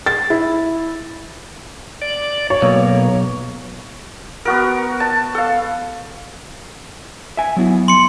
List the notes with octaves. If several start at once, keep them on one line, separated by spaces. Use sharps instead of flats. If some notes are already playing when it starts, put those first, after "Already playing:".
A6
E4
D5
C#5
B1 B2 A#3
B3 F#4 A#4
A5
A4 F5
E5 G#5
F#3 B3 E4
C6 C#7